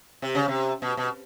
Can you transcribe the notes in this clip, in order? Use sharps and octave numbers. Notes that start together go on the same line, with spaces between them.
C3
C#3
C3
B2
B2